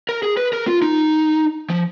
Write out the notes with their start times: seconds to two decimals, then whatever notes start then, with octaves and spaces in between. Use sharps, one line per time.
0.09 A#4
0.23 G#4
0.37 B4
0.53 A#4
0.67 F4
0.82 D#4
1.70 F3